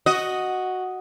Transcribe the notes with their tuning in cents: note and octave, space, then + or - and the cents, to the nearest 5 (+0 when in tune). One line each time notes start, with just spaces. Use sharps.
F#4 +0 D#5 +0